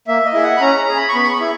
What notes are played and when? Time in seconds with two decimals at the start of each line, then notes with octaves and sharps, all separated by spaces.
0.07 A#3 E5
0.25 D#5
0.33 E4 G#4 E5
0.43 F#5
0.57 B5
0.61 C#4 A#5
0.79 A#5
0.88 G#4
0.96 B5
1.09 C#6
1.13 B3 B5
1.24 C#6
1.32 B5
1.40 E4 G#4